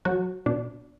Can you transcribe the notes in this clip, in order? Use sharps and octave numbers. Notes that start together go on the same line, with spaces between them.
F#3 F#4
B2 D4